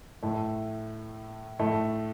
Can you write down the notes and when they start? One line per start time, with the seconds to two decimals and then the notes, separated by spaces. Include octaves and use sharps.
0.23 A2 A3
1.59 A2 A3